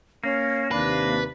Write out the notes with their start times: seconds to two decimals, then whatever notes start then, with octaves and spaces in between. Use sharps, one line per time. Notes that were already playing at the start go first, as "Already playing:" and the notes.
0.24 A#3 C#4
0.71 D#2 C3 D4 B4